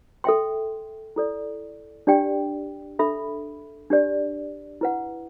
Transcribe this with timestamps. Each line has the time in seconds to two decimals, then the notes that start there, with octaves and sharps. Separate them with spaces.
0.24 A4 E5 G5 C6
1.16 E4 A4 D5
2.07 D4 G4 D5 G5
2.99 D4 A4 E5 B5
3.90 D4 G4 D5
4.81 E4 B4 F#5